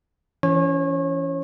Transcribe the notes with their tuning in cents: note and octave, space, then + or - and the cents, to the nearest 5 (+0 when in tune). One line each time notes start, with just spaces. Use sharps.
E3 +30 C#4 +20 C#5 -30